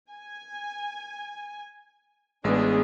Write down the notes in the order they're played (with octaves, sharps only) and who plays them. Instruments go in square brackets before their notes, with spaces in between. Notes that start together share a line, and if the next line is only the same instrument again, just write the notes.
[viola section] G#5
[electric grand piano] A1 G#3 [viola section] B3 D4 G#4